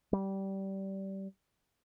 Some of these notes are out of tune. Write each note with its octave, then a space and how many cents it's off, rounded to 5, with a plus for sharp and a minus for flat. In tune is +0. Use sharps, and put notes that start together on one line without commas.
G3 -20